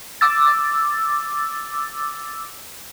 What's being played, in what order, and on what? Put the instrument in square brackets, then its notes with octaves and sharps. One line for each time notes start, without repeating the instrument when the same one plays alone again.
[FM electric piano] D6 E6 A6